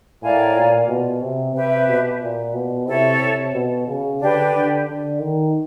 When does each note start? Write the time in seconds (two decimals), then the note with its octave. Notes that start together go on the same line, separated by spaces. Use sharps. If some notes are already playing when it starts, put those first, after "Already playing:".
0.22 A2 A#4 D5 F5 G#5
0.56 A#2
0.88 B2
1.21 C3
1.55 C3 G4 B4 E5
1.87 B2
2.22 A#2
2.54 B2
2.87 C3 E4 A4 C#5
3.21 C3
3.54 B2
3.87 C#3
4.20 D3 D4 G4 B4
4.53 D3
4.86 D3
5.19 D#3